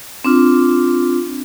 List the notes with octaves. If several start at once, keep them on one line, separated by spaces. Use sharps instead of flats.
C4 D4 F4